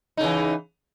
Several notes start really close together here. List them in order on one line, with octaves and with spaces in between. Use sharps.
D#4 C#3 E3